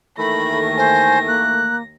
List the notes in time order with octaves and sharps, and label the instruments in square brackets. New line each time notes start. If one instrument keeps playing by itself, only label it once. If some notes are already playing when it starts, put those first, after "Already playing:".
[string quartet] D#2 A#6 [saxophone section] D#3 E3 A3 [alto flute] A4 [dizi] B5
[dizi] C5 [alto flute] G#5
[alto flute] A#3 [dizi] F#6